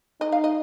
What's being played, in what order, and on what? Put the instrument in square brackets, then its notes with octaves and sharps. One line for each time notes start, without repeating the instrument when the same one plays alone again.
[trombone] D#4 [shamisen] D#5
[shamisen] F5
D#5